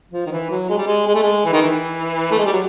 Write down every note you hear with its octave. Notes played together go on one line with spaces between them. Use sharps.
F3
D#3
E3
F#3
G#3
G3
G#3
G#3
A3
G#3
E3
D#3
E3
A3
G#3
G3
F#3